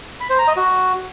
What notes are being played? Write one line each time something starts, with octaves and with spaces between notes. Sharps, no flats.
B5
C5
A#5
D#5
F#4